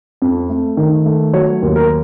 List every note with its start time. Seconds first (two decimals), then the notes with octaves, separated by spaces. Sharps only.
0.22 F2
0.50 A3
0.77 D#3
1.06 A3
1.33 F#3 C#5
1.62 D#2
1.76 A#4